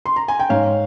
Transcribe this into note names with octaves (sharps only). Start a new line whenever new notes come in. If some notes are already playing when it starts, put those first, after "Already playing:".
C6
A#5
G#5
G5
G#2 C#5 F5